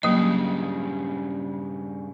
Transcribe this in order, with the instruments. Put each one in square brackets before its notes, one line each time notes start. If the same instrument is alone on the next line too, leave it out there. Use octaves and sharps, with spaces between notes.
[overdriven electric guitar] G2 C#3 [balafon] F#3 A#3 D#5